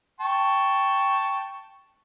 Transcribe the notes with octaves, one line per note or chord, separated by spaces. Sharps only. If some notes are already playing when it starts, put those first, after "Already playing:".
G5 A5 C#6